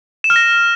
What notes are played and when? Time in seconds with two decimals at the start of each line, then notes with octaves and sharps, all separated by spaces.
0.24 E7
0.30 F6
0.36 A#6